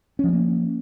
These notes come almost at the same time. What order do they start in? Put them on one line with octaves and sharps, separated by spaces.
C#4 F3 B3 A#3